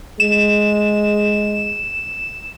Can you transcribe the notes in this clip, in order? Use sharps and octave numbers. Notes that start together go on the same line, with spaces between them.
G#3 E7